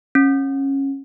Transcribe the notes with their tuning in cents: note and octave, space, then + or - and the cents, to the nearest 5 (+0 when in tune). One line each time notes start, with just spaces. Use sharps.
C#4 -20